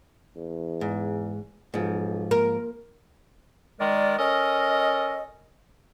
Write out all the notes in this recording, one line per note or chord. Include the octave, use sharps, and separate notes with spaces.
E2
G#2
B1 G#2 F3
A#3 A#4
D#3 G#3 A#4 D5
C#4 A4 A#4 D#5